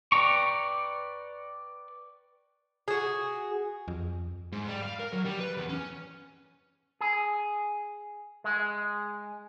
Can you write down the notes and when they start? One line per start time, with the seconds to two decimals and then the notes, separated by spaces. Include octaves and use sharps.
0.12 B4 D5 G5 A#5 C#6
2.88 F#4 G#4
3.88 F2
4.52 G#2
4.67 G3
4.82 F5
4.99 A#4
5.12 F#3
5.25 G3
5.40 B4
5.57 E2
5.69 C#4
7.01 G#4
8.44 G#3